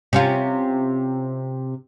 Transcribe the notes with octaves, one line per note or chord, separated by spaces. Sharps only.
C3 C#4 F4